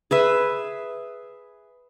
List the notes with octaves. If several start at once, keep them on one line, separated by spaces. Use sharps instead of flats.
G#4 B4 E5